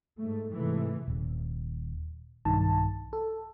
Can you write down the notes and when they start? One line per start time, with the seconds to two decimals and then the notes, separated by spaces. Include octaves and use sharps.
0.18 G#2 A3
0.52 G#2 C3 E3 A3
1.08 D#1
2.45 B1 G2 D#3 A5
3.13 A4